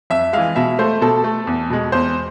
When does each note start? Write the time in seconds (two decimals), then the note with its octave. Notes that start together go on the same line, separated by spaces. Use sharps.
0.10 F2 E5
0.33 E3 G#3 F5
0.56 B2 E5
0.79 A3 C5
1.01 B2 A4
1.24 A3
1.47 E2
1.70 B2 G#3
1.92 E2 C5